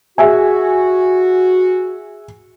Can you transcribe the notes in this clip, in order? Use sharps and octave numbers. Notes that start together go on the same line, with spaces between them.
F#4 G#4 E5 G#5